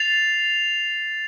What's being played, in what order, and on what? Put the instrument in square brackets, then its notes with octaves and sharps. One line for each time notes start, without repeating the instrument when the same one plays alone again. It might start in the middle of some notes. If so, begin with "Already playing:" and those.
Already playing: [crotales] A6 C7 F7